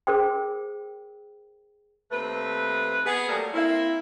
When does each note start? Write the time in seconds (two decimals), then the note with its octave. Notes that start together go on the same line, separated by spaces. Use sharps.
0.07 G#4 A#4 C5 G5
2.12 D#2 A3 C4 B4
3.06 B3 G#4
3.29 F#3 G3 A3 A#3 A4
3.54 A#3 C4 E4